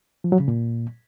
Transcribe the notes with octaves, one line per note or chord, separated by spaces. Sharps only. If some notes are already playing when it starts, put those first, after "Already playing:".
F3
F#3
C#3
A#2